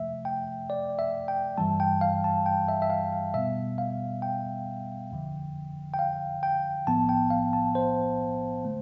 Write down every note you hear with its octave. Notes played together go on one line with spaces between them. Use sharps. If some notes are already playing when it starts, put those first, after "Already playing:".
Already playing: F2 C3 F3 A3 E5
G5
D5
E5
G5
G2 E3 G3 A5
G5
F5
A5
G5
E5
E5
F5
F5
B2 G3 B3 E5
F5
G5
G1 F2 D3 F3
G5
F5
G5
B1 A2 F3 B3 A5
G5
F5
A5
C5
D3 A3